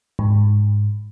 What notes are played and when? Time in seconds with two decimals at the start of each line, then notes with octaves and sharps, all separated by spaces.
0.19 G#2